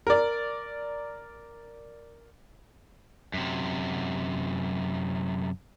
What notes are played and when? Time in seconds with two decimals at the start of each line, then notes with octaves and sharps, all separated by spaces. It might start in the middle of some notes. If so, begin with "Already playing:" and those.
0.07 A#4 D5
3.34 F#2 C3